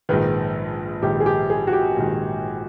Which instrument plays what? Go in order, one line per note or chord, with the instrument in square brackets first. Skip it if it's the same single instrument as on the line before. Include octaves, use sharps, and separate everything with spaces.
[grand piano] A#1 G#2 D#3 [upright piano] B4
[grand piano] A#1 G#2 D#3 [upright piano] G4
[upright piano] G#4
G4
G#4
F#4
G4
[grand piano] A#1 G#2 D#3